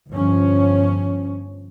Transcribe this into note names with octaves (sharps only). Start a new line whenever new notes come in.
G1 F3 C#4